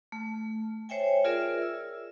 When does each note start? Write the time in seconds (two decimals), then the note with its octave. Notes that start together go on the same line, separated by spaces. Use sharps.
0.12 A3
0.89 C5 C#5 E5 G5 G#5
1.25 F4 G#4 A#4 D5 E5
1.62 E6